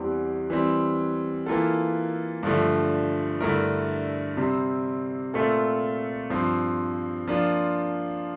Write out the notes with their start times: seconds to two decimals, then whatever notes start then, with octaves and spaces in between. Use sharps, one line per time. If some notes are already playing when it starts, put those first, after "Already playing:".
Already playing: E2 E3 G3 C4 G4
0.50 E3 G3 C4
1.46 E3 A#3 F4 A4
2.43 G2 D3 F3 A3
3.40 G2 D3 A3 E4 A#4
4.37 C3 G3 C4
5.34 A#2 A3 C4 F4 A4
6.30 G2 F3 C4
7.27 F3 A#3 D4 F4